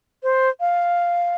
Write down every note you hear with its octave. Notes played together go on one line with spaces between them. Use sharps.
C5
F5